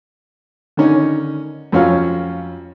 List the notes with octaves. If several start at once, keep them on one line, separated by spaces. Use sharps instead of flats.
D3 D#3 C#4 D#4
F2 F#3 C#4 F4 F5